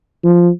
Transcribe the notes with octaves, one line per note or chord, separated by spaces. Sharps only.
F3